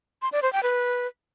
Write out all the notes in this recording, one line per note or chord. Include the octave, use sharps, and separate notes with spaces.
C6
D5
C5
G5
B4